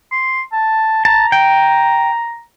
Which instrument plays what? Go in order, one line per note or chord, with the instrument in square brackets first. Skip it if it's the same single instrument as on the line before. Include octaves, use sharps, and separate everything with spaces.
[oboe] C6
A5
[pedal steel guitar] A5 [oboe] A#5
[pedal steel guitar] G5